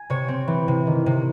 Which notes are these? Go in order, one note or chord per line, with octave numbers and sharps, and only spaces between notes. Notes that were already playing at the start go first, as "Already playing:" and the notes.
Already playing: G#5
C3 C#5
C4
E3
C3
D#3
C3